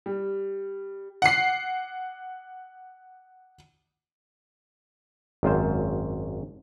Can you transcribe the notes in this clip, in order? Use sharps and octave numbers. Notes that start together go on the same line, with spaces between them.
G3
F#5 C7
G#1 F#2 F4 C5